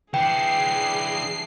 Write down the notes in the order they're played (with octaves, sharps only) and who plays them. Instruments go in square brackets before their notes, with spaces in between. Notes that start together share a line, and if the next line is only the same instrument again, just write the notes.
[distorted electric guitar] E3 D4 [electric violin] G#4 [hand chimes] G5 [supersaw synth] C7